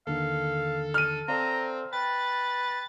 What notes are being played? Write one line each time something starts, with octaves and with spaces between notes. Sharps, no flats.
D#2 D3 D#3 A4 F5
F6 D#7
C4 A4 D5 F5 A#5
B4 G5 A6